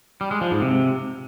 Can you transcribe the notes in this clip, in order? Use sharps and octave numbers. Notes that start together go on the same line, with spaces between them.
G3
G#3
F3
G#2
C3